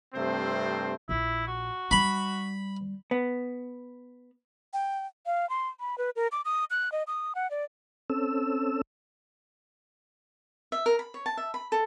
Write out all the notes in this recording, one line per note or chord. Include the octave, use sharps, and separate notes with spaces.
G2 C3 A3 C4 C5
A#1 E4
F#4
G3 B5
B3
G5
F5
C6
B5
B4
A#4
D6
D#6
F#6
D#5
D#6
F#5
D5
C4 C#4 A4 E6
E5
A#4
B5
C#5
A5
E5
B5
A4